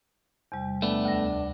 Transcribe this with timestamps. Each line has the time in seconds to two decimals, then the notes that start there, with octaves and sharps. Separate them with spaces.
0.52 E2 C3 G3
0.82 A3 B3 D4
1.05 D2 A#6